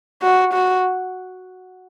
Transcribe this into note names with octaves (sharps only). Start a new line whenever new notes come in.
F#4
F#4